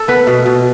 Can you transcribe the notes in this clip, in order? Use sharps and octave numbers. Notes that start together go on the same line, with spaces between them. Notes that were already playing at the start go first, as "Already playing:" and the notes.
Already playing: A4
B3 B4
B2
B2